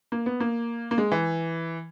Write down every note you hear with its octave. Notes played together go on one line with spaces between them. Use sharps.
A#3
B3
A#3
A#3
G#3
E3